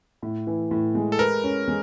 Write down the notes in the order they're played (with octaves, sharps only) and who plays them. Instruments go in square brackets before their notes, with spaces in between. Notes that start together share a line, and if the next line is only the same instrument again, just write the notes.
[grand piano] A2
E3
A2
G#3
[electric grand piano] A4
[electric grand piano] A#4 [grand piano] B4
[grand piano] C#4
G#3